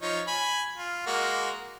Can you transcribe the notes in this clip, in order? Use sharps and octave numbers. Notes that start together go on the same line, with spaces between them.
F3 D#4 C#5
G#5 B5
F4
G#3 A#3 F#4